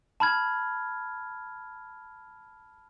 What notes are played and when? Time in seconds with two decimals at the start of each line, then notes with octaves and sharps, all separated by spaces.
0.20 A5 B5 F6 G#6